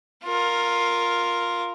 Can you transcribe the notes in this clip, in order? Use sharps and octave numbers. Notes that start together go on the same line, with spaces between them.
F4 A#4